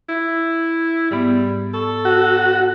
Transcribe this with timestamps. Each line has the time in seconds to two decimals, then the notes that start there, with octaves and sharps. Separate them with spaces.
0.09 E4
1.11 G#2 G3 B3
1.74 A4 C#6
2.05 F#4